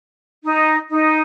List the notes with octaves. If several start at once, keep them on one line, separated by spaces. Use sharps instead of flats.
D#4
D#4